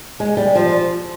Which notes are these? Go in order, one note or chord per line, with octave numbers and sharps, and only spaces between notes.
G#3
G3
F3